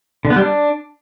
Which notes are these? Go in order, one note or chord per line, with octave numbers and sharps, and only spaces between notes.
D3
B3
G3
D4